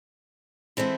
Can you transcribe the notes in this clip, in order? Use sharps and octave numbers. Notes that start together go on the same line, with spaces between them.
E3 G#3 C4 E4 A4